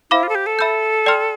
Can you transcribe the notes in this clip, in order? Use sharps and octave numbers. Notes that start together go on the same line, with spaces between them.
E4 C5 F5 B5 D6
F4
A4
G4
A4
E5 B5 E6 G6
D5 G5 C6 F6